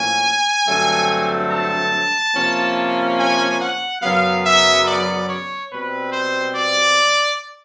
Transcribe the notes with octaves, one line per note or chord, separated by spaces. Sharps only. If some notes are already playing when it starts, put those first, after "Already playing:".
Already playing: A2 F3 A#3 C#4 G#5
G2 D3 F#3 A3 C4
A5
C3 F3 A#3 C#4
G#5
F#5
F#2 C#3 F#3 B3 F5
E5
D5
C#5
B2 G3 C4 B4
C5
D5